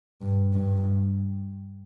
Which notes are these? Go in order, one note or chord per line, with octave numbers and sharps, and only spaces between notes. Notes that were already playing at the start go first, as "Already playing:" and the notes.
G2
G2